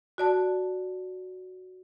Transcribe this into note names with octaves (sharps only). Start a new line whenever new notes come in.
F#4 D5 A5